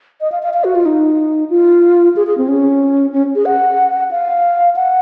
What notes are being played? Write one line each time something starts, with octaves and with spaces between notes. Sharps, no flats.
D#5
F5
F5
F5
F#4
F4
D#4
F4
G#4
G#4
C4
C#4
C#4
G#4
F#5
F5
F#5